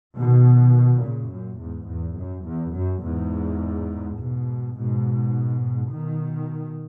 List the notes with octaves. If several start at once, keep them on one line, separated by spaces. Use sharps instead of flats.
B2 D#3
A#2 C#3
F#2 A#2
E2 G#2
E2
F#2
E2
F#2
E2 G#2
G#2 B2
G#2 B2
B2 D#3